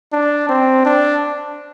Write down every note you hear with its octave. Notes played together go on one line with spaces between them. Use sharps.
D4
C4
D4